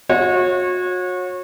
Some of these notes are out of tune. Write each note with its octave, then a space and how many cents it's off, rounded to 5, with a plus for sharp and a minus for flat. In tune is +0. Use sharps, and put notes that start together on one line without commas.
F#4 -35 C#5 -25